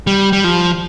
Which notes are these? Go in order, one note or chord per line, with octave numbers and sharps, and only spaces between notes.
G3
G3
F3